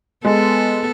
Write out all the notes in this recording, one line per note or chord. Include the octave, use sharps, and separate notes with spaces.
G#3 B3 A4